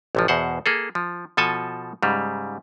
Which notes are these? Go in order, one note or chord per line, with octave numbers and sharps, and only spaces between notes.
A1 C3 F3
E2 B2 C5 F#5
A#3 G#4 A4
F3
B2 F3 A4 G#5 A5
G#2 C#3 G3